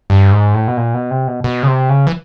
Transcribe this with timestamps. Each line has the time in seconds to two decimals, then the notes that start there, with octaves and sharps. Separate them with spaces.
0.10 G2
0.32 G#2
0.54 A2
0.68 B2
0.77 A#2
0.94 B2
1.11 C3
1.28 B2
1.44 B2
1.63 C#3
1.67 C3
1.89 C#3
2.07 E3